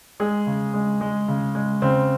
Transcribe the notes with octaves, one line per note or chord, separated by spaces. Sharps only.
G#3 G#4
C#3
G#3
G#3
C#3
G#3
C#3 C4